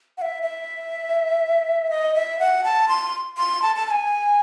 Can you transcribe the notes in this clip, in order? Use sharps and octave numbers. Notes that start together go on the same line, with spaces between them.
F#5
E5
E5
D#5
E5
F#5
A5
C6
C6
A5
A5
A5
G#5